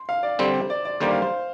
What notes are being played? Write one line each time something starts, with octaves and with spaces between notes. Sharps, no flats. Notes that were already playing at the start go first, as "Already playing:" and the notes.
Already playing: C6
F5
D5
D3 G3 C4 C5
D5
D5
D#2 D3 G3 A#3 C5
F5
C5